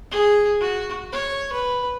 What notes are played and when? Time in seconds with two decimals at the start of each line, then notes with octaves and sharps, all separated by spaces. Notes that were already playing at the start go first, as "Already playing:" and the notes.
0.11 G#4
0.61 F#4
1.12 C#5
1.52 B4